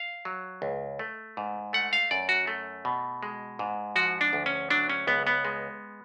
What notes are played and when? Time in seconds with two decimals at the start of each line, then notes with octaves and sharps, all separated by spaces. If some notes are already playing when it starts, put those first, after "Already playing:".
Already playing: F5
0.25 F#3
0.62 C#2
0.99 A3
1.37 G#2
1.73 A3 F#5
1.93 F5
2.11 F#2 D5
2.29 F#4
2.47 A3
2.85 B2
3.23 G#3
3.59 G#2
3.96 F3 F#4
4.21 D4
4.33 D2
4.46 C#4
4.70 F#3 D4
4.90 C#4
5.07 C#2 B3
5.27 B3
5.45 G#3